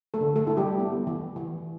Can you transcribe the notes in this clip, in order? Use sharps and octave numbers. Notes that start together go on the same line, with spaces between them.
A3 A4
D3
A3 A4
A3 E4
G3 G4
B3
E3
E3